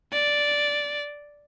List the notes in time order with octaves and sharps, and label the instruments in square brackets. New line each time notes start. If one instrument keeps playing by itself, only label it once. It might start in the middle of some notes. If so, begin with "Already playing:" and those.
[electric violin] D5